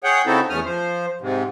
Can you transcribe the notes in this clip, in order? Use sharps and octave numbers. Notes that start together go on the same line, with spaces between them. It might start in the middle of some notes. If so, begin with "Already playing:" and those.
G#4 C#5 F#5 G5
C#3 C4 D#4 E4 F#4 A4
E2 A3 C#4 D#6 F6
F3 C5
G#2 C3